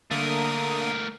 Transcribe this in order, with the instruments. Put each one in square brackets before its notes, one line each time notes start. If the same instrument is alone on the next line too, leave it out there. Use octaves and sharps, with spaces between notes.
[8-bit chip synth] D3 A#3 D#6 [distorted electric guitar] A3 A#4